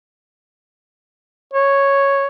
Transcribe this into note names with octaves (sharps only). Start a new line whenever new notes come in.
C#5